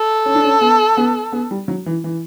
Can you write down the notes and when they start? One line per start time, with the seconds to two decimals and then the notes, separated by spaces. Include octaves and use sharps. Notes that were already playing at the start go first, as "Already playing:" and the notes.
Already playing: A4
0.26 C#4
0.35 D4
0.44 C#4
0.61 B3
0.97 B3
1.32 B3
1.51 G3
1.68 F#3
1.86 E3
2.04 E3